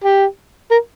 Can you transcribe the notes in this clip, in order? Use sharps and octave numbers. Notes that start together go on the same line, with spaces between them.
G4
A#4